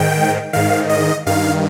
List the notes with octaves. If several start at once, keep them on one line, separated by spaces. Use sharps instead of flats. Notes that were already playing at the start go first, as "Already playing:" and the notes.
Already playing: G#2 D#3 G5
G#2 D#3 F5
D#5
G2 D#3 F5